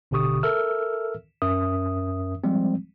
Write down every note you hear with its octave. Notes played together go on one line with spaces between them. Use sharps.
G#1 B2 D3 G4 C#6 D#6
A4 A#4 E5 E6 F6
F#2 C#4 A#4 E5 D#6
F3 G3 G#3 C4